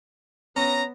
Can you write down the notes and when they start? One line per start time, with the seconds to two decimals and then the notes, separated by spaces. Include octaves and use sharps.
0.56 B3 C#4 A#5 A#6